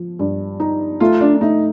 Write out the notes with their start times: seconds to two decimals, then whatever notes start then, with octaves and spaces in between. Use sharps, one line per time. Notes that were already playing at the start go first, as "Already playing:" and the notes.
Already playing: F3
0.19 G2
0.60 D#4
1.00 A3 F4
1.21 D4
1.35 D4
1.41 A3 D#4